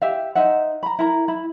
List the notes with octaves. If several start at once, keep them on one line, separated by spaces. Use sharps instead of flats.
G4 E5 F5
D#4 C5 E5 F#5
A#5 B5
E4 A#4 A#5
E4 B5